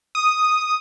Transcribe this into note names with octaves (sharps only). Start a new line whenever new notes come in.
D#6